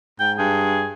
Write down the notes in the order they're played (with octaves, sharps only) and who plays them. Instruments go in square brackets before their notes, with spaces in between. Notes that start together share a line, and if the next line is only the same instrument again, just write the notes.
[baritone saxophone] G#2 [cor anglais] G5
[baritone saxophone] G2 [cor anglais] G#4